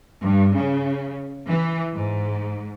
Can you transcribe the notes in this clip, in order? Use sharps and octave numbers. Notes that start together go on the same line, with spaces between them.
G2
C#3
E3
G#2